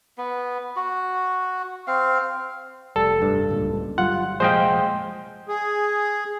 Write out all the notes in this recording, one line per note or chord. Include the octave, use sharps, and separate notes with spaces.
B3
F#4
C4 F5
F1 G3 A4
G2
D1 C#2 A#2
G1 F#3 G3 F4 F#5
F1 A#2 F3 G#3 C5 D#5 F5 G5
G#4